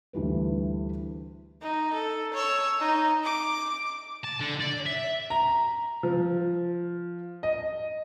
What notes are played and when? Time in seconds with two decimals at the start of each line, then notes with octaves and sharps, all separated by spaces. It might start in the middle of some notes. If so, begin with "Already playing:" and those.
0.13 D2 E3 G3 B4
1.62 D#4
1.93 A4
2.34 C#5 E6
2.80 D#4
3.24 D6
4.24 A5
4.41 D3
4.61 D5
4.86 E5
5.30 A#5
6.03 F3
7.43 D#5